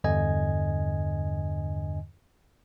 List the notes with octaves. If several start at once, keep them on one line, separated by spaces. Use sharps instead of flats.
E2 G2 D3 D#5 G#5 G#6